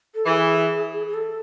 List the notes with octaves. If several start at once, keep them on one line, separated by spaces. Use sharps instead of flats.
A4
E3 G#4
G#4
A4